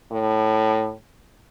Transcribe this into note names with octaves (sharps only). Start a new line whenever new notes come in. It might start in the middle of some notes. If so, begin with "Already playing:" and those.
A2